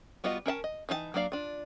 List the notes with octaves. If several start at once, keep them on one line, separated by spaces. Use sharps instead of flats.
G3 B3 F4 F#4 D#5
C#4 A#4 E5 A5
D#5
E3 D#4 F4 A5
F#3 A#3 D4 D5 F5
D4 F4